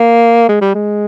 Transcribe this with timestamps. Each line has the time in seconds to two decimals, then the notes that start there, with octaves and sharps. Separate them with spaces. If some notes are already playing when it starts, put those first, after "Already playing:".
Already playing: A#3
0.49 G#3
0.61 G3
0.74 G#3